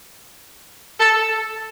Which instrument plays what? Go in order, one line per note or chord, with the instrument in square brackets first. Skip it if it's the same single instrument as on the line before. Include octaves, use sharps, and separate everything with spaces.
[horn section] A4